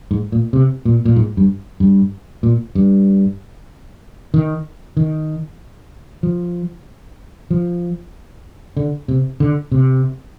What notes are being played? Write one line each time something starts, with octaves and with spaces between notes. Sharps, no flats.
G#2
A#2
C3
A#2
A#2
G#2
G2
G2
A#2
G2
D#3
D#3
F3
F3
D3
C3
D3
C3